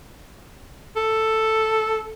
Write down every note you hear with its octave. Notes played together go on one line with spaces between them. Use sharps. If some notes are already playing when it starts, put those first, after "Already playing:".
A4